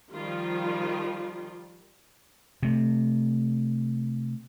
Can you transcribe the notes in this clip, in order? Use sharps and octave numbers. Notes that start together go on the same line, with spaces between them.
D#3 F3 G3 F4
C3 A3